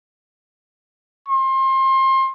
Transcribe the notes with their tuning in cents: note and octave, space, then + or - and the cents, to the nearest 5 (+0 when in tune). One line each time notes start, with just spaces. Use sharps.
C6 +30